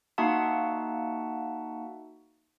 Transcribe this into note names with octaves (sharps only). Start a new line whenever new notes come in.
A#3 D#4 F#4 E5 F#5 A5